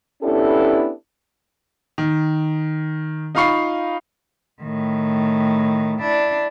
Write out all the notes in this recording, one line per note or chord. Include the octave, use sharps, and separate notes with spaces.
B3 C#4 D4 E4 G4 A4
D#3
D#4 F4 F5 B5 C#6 C7
A2 D#3
D4 E4